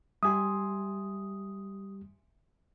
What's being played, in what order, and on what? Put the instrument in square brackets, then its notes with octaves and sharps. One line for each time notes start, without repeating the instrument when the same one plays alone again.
[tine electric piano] G3 G4 [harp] E5 G#5 C6 [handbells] D#6